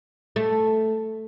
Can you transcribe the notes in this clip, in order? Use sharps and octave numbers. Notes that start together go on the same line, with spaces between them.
A3